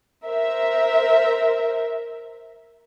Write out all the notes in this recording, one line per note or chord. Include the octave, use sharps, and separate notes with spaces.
A#4 C5 E5